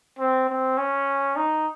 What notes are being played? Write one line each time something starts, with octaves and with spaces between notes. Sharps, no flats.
C4
C4
C#4
D#4